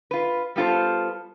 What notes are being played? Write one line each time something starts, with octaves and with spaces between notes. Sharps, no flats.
F4 B4
G3 B3 F4 A4 C5